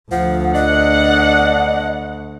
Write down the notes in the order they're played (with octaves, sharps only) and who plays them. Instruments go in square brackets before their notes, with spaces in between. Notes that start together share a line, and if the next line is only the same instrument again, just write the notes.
[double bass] D2 [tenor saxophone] F3 [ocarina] F#5
[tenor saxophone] D4 [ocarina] D#5 [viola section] F#5